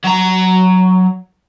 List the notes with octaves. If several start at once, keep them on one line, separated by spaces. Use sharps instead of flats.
F#3 A#5